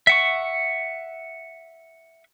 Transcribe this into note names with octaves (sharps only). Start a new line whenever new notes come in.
E5 F#5 C#6